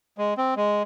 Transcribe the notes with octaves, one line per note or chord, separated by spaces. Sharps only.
G#3
C4
G#3